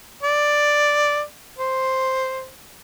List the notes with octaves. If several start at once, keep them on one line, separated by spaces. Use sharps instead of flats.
D5
C5